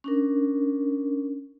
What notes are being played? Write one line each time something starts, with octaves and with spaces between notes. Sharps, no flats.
C#4 D4 A#4